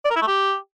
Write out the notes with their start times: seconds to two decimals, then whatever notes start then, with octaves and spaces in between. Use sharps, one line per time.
0.05 D5
0.10 A#4
0.16 E4
0.22 A3
0.27 G4